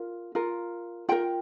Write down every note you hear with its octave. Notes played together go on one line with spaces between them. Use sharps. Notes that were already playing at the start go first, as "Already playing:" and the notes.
Already playing: F4 A#4
F4 A#4
F4 A#4 G5